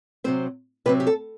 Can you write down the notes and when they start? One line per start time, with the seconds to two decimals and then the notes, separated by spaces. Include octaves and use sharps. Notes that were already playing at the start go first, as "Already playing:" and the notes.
0.24 C3 F#3 C4 C5
0.86 C3 F#3 C4 B4
1.00 G4
1.07 A4